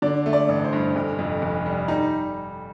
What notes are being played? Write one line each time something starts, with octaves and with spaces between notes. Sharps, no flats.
D3 D5
A3
D5
A1
C5
G2
F1
F2
F1
G3
G3 D#4